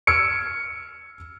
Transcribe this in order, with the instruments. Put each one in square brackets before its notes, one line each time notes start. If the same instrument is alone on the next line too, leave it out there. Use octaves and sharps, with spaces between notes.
[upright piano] E6 F6 G#6 C#7 D7